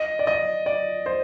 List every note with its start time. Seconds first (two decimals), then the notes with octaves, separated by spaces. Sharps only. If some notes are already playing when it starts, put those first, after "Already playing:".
Already playing: D#5
0.19 D5
0.27 D#5
0.66 D5
1.06 C5